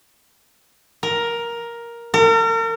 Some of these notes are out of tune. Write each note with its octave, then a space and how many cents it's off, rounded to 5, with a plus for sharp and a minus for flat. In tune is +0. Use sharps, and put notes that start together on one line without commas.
A#4 +10
A#4 -40